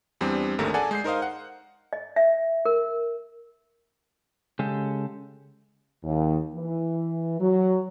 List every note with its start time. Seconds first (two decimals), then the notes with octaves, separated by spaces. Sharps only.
0.21 E2 G3 C4 D4
0.58 G#1 D#2 D3 A3 A#4
0.74 G#4 A4 D5 F#5 G#5
0.91 G#3 G6 C7
1.04 D#4 A#4 C5 D#5 F5
1.22 F#5
1.93 D#5
2.16 E5
2.66 A#4
4.59 C#3 G#3 G4 A4
6.04 D#2
6.54 E3
7.40 F#3